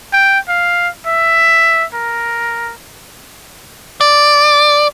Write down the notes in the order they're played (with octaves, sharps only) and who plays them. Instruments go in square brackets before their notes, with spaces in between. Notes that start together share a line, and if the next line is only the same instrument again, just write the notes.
[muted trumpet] G5
F5
E5
A#4
[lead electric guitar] D5